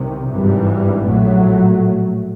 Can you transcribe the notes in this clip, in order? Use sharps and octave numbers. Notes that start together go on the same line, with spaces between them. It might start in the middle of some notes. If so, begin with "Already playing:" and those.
Already playing: C2 C3 D#3
G#1 G2 E3 G3
A#1 A2 F#3 A3